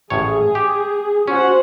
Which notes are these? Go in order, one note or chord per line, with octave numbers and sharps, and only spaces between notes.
A1 A2 G#4 C#5
G4
C#4 F#4 C5 F#5